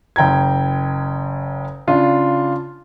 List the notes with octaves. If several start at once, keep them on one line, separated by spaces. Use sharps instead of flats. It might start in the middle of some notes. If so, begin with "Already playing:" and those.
F#1 G5 A#5 G#6
C#3 D4 F4